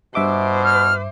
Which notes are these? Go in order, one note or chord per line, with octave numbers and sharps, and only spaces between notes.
G2 B2 C5 E5 D6
F6